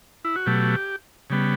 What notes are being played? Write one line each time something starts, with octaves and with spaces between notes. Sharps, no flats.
E4
F#4
B2 F#3 A3 G4
C#3 G3 B3